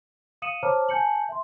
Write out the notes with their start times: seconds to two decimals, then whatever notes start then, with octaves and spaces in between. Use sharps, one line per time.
0.42 F5 D#6 C#7 D#7 E7 F#7
0.63 C5 C#5 A5 A#5 D6 F6
0.89 G#5 A5 G6 C#7 F#7
1.29 E5 C6